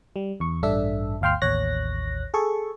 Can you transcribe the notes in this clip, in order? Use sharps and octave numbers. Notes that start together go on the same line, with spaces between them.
G3
E2 C#6
A1 G2 D4 A4 E5
G1 D2 F5 G5 C6 F6
A1 D#2 C#5 F#6 A#6
G#4 A4 C#6